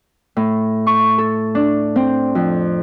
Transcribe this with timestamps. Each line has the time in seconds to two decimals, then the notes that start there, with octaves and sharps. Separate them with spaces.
0.37 A2
0.87 C#6
1.18 A4
1.55 D4
1.96 C4
2.35 F2